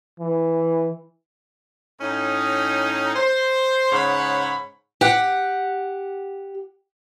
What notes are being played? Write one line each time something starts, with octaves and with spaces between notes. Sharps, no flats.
E3
A2 C#4 D#4
C5
G#2 C#3 C#5 F#5 B5
G4 F#5